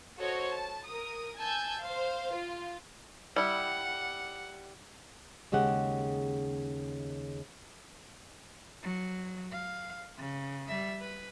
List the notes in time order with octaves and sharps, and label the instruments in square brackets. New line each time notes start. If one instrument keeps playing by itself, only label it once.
[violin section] F#4 A4 C5 C#5 D#5
A5
A#4 D#6
G#5 A5 E6 G6 G#6
C5 F5
F4
[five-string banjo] G3 E4 [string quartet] F#5
[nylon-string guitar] D#2 C#3 G#3 G4 F#5
[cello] F#3
F5
C#3
G3 E5
B4